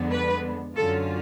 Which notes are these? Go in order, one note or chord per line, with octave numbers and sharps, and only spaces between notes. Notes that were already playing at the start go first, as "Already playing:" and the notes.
Already playing: F2 D3 G#3 B3 D4
B4
F#2 D3 F#3 C#4 F4 A4